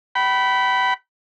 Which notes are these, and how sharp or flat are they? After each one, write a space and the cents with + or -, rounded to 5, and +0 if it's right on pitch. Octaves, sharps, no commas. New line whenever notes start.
G5 -40 B5 +0